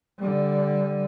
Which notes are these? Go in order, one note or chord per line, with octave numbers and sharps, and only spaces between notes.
D3 G3